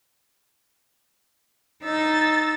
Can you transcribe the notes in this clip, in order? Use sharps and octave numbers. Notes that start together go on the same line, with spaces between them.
D#4 E6 A6